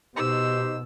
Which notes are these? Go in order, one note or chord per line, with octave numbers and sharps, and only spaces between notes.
B2 D#4 G4 C5 E6